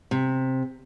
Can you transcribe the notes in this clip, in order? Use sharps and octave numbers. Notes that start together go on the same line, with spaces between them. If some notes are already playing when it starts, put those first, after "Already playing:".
C3